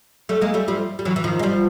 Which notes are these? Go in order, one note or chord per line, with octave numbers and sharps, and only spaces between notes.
G3 A3
G#3 A#3
G3 A3
F3 G3
G3
E3 F#3
E3
D#3 F3
G#3
F3 G3